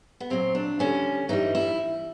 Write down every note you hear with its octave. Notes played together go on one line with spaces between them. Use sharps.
B3
A#2 F#3 C4
D4
F2 D3 G3 C#4
G2 E3 G3 D#4
E4